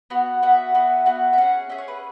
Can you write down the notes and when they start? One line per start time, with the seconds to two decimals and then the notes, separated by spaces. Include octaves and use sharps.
0.10 B3 F#4
0.42 B3 F#4 E5
0.75 B3 F#4
1.06 B3 F#4
1.33 E5
1.38 C#4 G#4 F#5
1.69 C#4 G#4 E5
1.78 C#5
1.88 B4